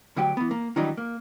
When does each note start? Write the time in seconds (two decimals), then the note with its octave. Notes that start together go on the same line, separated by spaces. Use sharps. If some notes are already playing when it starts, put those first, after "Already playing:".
0.17 D2 F#3 G4 G5
0.37 E3 B3
0.51 A#3
0.76 D#3 E3 F#3 G3 D4 D#4
0.97 A#3